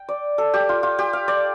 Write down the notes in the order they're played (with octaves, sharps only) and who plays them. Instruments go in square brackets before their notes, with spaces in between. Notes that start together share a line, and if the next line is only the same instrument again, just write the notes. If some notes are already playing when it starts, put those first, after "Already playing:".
Already playing: [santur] G5
D5
A4
G4
F4
F4
G4
F5
D5